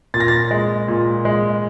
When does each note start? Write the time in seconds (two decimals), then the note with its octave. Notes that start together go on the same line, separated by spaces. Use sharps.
0.14 A#2 A6
0.20 A#6
0.28 A6
0.51 G#3
0.88 A#2
1.25 G#3